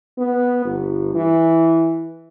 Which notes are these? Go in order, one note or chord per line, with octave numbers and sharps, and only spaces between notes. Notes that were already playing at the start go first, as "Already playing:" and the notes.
B3
G1
E3